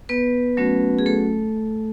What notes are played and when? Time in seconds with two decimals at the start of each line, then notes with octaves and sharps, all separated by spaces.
0.09 B3 B4
0.57 F#3 A3 C#4 F#4
0.99 G#4
1.06 A3 A4